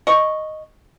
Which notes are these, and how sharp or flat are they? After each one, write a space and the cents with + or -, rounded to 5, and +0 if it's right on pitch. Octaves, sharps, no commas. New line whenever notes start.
D#5 +0 C#6 -5